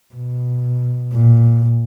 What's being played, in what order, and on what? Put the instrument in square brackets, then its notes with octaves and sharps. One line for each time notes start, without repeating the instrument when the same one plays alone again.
[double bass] B2
A#2